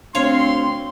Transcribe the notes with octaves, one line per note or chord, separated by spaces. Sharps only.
D2 C4 C#5 F5 C6